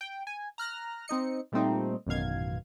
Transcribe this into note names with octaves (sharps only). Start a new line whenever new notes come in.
G5
G#5
A#5 F6 F#6 A#6
C4 D#4 D#5 C#7
A#2 G3 A3 C4 D#4
A1 F#2 B2 D#3 F5 G#6